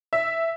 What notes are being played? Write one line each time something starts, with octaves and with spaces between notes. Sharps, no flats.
E5